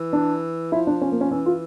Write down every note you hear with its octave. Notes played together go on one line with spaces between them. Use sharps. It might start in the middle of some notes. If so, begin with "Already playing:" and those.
Already playing: E3
D4
F3 E4
D4
C#4
A#3
C#4
E3 C#4
F4